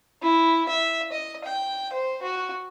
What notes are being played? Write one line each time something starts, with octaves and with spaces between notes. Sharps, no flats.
E4
E5
D#5
G5
C5
F#4